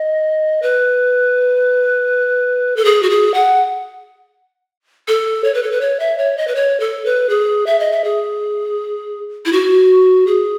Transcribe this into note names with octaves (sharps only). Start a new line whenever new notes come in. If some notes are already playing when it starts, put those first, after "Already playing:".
Already playing: D#5
B4
A4
G#4
F#4
G#4
F#5
A4
C#5
B4
A4
B4
C#5
E5
C#5
D#5
B4
C#5
A4
B4
G#4
E5
D#5
E5
G#4
E4
F#4
G#4